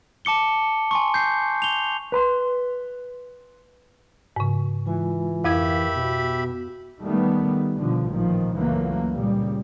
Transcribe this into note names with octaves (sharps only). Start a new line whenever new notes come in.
A5 D6 C#7 G7
G#5 C6 C#6
G6 C7
F7 G7
B4 B5 C6
G#2 C#3
E3 G#3 F4 G#5
F2 E4 G4 A#4 E5 F5 B5 G#6
B2 B3 F#4
D#3 G3 A3 B3
B2 D3 F3
A1 A#2 D#3 F3
C#2 F#2 E3 F#3 A3 A#3
A#2 C#3 G3